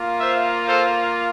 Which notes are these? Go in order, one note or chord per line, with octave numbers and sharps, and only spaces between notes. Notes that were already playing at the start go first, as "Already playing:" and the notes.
Already playing: A#3 F4
C5 E5
A4 C5